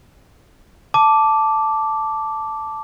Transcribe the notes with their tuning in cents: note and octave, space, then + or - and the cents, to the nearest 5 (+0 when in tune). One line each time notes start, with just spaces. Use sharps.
A5 +0 D6 -5